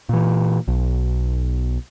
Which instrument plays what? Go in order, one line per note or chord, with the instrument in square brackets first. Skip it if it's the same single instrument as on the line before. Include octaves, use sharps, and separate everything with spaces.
[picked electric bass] A#2 E3
B1